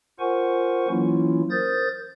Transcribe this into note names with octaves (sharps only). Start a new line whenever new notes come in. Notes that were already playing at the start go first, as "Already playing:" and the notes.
F4 A#4 C5 F#5 G#5 C#6
E3 F#3 A#3 C#4 E4 F4
A#4 C5 D#6 G6 A6